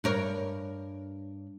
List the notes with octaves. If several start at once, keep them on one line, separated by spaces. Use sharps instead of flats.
G2 A#4 C#5